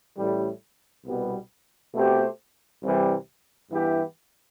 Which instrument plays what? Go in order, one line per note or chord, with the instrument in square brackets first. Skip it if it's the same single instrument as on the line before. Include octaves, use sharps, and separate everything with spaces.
[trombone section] A1 A2 G3
C2 B2 G3 B3
B2 A3 C4 G4 C5
C2 C3 E3 G3
G2 E3 B3 E4 G4